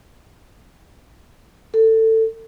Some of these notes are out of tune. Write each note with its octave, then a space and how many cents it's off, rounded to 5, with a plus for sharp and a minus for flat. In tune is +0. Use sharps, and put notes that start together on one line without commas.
A4 +20